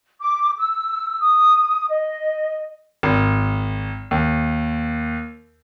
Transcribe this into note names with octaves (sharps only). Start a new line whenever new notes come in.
D6
E6
D#6
D#5
G#1
D#2